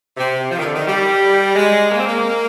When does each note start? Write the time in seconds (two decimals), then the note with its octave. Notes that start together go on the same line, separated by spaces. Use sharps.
0.17 C3
0.51 F3
0.59 D#3
0.66 D3
0.74 D#3
0.86 G3
1.55 G#3
1.91 A#3
1.99 C4
2.07 A#3